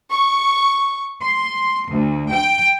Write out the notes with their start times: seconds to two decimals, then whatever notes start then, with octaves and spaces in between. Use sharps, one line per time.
0.11 C#6
1.21 C6
1.89 D2
2.31 G5